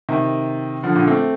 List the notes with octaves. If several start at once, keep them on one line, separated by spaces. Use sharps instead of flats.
C3 D#3
D3 F3
A#2 D3
A3 C4